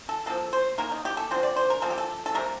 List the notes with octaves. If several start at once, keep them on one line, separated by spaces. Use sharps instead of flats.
A4
F3 A#3 A4
C5
D#3 A#3 A#4
D#4
G4
A4
D3 F3 C4 C5
D5
C5
A#4
F3 A#3 A4
G4
A4
A4
C3 G3 A#3 A#4